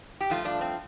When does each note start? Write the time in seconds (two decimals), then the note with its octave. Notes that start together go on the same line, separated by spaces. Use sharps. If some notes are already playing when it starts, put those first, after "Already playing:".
0.21 G4
0.30 G2 F3 A3 F4
0.45 D4
0.61 C4